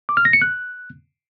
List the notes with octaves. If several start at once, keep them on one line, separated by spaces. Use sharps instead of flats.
D6
F6
A#6
C#7
F#6